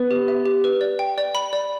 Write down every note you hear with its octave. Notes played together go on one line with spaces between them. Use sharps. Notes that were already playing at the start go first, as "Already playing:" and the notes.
Already playing: B3 B4
G4
E5
G4
B4
D5
G5
D5
B5
D5